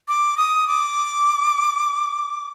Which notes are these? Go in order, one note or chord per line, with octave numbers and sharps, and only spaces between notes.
D6
D#6
D6